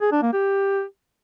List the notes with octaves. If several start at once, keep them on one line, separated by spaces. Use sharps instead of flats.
G#4
D4
A#3
G4